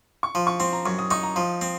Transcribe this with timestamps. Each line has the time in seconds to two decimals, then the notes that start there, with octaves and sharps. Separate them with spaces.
0.23 C#6
0.35 F3 C6
0.47 C#6
0.60 C4 C6
0.73 A#5
0.86 F#2 C#6
0.99 D#6
1.11 D#4 C#6
1.23 A#5
1.36 F3 C6
1.61 C4